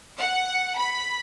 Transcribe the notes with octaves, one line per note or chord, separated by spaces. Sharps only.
F#5
B5